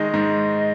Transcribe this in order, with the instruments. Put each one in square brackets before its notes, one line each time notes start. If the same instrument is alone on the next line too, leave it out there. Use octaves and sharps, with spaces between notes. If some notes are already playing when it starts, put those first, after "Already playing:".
Already playing: [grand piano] D#3 G#3 D#4 [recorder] D#5
[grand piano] G#2